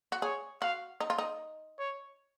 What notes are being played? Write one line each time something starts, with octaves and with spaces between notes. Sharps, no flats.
F#4
G#4 C#5
F#4 F5
D#4
F4
D#4
C#5